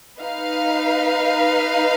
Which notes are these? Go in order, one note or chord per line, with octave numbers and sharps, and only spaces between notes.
D#4 B4 F5